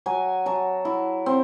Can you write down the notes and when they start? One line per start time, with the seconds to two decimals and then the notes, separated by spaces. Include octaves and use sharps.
0.06 F#3 G#5
0.46 F#3 A5
0.85 E4
1.26 C4